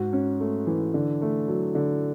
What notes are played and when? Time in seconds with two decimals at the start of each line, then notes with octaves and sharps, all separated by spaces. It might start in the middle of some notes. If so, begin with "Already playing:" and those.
Already playing: G#2 F#4
0.13 C#4
0.41 A3
0.67 E3
0.94 D3
1.21 A3
1.48 F#3
1.75 D3